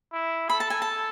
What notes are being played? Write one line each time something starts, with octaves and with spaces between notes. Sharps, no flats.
E4
A4 B5
A5
G#5
A5